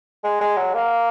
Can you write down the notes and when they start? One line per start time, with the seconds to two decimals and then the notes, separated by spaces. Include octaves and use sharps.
0.24 G#3
0.41 G#3
0.57 F#3
0.74 A#3